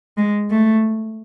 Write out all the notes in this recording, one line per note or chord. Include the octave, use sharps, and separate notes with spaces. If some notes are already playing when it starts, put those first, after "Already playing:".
G#3
A3